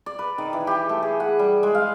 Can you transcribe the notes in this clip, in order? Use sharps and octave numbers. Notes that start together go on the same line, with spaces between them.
D5
B4
D#3
E3
G4
A3
G#4
F#5
G3
G#3
F5